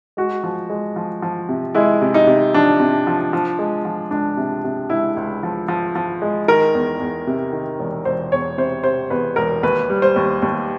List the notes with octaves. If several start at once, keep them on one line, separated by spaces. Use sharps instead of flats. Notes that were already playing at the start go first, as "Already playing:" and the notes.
G#3 F#4
F3
G#3
F3
F3
C3
G#3 E4
C3
D#4
C3
F3 D4
C3
F3
F3
G#3
F3
C#2 D4
C3
C3
C#2 E4
C#2
F3
F3
F3
G#3
D#3 A#4
E2
E2
C3
D#3
E1
E1 C5
E2 C#5
C3 C5
C3 C5
E2 B4
E1 A#4
D#2 B4
G3
C5
D#2
D#2